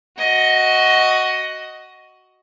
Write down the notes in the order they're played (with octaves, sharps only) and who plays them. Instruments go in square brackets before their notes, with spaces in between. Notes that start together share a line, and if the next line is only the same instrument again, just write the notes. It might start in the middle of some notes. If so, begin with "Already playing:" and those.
[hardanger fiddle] F#4 D#5